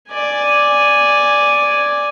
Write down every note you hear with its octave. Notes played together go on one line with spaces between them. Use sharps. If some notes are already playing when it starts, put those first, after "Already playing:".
D5 G#5